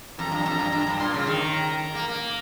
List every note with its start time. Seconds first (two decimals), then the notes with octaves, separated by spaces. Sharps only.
0.19 F2 A#5
0.32 G2
0.46 F2
0.59 G2
0.72 G2
0.87 G2
1.00 A#2 C6
1.14 C#3
1.27 D#3
1.40 A#5
1.81 A#5
1.95 A#3
2.08 A#3